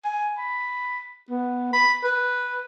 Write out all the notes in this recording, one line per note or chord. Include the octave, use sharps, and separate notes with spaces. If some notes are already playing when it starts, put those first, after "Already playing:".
G#5
B5
B3
B5
B4